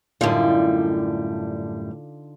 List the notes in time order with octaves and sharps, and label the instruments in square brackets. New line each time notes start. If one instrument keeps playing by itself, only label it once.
[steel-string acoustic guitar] F#2 A2 G3 [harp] D3 D#4 F4